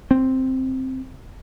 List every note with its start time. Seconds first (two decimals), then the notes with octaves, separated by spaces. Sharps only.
0.11 C4